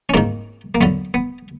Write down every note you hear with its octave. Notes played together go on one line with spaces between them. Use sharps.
C#4
G#2 D#3 A#3 C4
A#3
F#2 D3 B3
B3